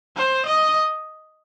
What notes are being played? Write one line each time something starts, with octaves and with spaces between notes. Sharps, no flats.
C5
D#5